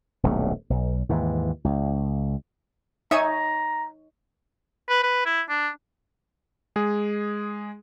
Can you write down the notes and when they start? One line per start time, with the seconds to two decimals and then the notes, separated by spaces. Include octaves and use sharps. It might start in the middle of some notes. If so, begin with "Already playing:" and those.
0.23 D#1 B1 G2 A3
0.70 B1
1.09 D#2 G#2 E3
1.65 C#2
3.11 D#4 C#5 E5 G#5 A#5 C#6 D#6
4.89 B4
5.03 B4
5.26 E4
5.49 D4
6.76 G#3 G#4